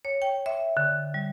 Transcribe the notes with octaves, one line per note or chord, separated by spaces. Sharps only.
C#5
G5
E5
D3
G3